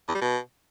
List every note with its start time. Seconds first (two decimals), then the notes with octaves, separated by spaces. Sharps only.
0.08 E2
0.15 G3
0.21 B2